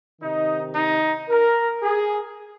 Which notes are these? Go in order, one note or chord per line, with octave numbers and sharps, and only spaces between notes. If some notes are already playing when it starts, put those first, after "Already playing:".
C3 D#3 D#4
D#4
A#4
G#4